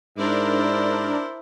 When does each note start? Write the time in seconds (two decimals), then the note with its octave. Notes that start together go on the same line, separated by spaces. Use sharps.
0.17 G#2 D4 E4 A#4 C5 D5